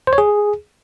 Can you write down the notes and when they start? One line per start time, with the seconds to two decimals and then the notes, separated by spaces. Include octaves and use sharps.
0.07 C5
0.13 C#5
0.18 G#4